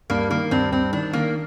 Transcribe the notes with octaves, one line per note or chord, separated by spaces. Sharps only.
G2 A#3
D#3 A#3
G2 C4
G2 C4
D#3 D4
D#3 A#3